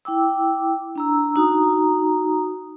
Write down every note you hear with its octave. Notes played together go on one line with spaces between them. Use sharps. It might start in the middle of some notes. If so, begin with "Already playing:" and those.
E4 G5 D6 E6
D4 A#5 E6
D#4 F#4 A#5 D#6